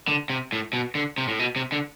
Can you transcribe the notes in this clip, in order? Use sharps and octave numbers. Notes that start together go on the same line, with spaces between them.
D3
C3
A2
B2
D3
C3
A2
B2
C3
D3